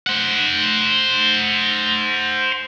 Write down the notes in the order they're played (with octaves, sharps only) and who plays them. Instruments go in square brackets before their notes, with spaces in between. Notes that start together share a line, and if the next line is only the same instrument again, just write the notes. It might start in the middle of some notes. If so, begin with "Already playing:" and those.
[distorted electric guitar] C5 F#5